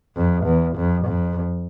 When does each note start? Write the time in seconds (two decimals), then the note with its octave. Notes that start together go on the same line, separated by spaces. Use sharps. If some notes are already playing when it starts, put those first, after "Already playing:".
0.16 F2
0.45 E2
0.76 F2
1.06 F2